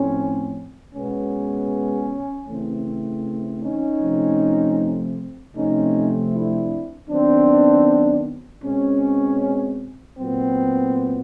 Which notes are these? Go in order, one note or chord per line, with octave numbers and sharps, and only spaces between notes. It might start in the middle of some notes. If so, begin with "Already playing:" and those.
Already playing: A2 F3 A3 C4 C#4
B2 G#3 B3 C#4
C#3 E3 A3 C4
C#4 D#4
C3 F3 A3 C4
C3 F3 A3 C4 C#4 D#4
D4 E4
D#3 F#3 B3 C4 D4
B2 G#3 C4 C#4
A#2 F#3 B3 C4